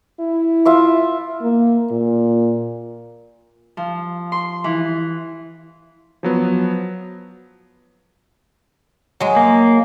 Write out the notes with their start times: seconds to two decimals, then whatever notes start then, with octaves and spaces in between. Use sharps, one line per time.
0.20 E4
0.65 F4 E5 D6
1.41 A#3
1.91 A#2
3.77 F3
4.32 C6
4.64 E3
6.23 F3 F#3 B3
9.20 F#3 G#3
9.36 A#3